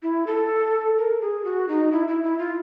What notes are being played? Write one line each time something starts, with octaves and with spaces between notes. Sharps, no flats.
E4
A4
A#4
G#4
F#4
D#4
E4
E4
E4
F4